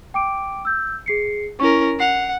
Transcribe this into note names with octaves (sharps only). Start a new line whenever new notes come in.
G5 D6 D7
E6 G6
G#4 C7 C#7
C#4 E4 A#4 C#6
F#5 C7 F7